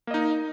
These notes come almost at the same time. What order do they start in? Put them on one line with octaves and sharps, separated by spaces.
A#3 D#5 D#4